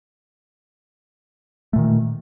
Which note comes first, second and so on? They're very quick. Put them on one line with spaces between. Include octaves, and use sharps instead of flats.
A3 A#2 D#3